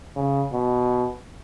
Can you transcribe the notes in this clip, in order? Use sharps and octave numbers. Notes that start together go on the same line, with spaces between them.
C#3
B2